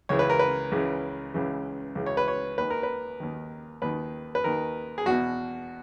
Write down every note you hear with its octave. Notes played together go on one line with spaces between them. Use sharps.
C#2 C#3 E3 C#5
B4
A#4
B4
C#2 C#3 E3
C#2 C#3 E3
C#2 C#3 E3
C#5
B4
C#5
D#2 D#3 B4
A#4
B4
D#2 D#3
D#2 D#3 B4
B4
D#2 D#3 A#4
G#4
E2 B2 F#4